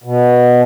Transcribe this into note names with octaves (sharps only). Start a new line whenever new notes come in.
B2